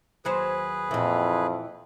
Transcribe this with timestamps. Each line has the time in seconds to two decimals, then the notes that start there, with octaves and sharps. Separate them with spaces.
0.25 D#2 F#3 G#4 B4 C5
0.91 F2 A#2 E3